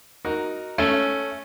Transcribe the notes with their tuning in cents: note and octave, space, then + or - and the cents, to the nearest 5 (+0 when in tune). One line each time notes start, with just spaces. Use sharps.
D#4 +0 F#4 +0 A#4 +0
A3 +0 C#4 +5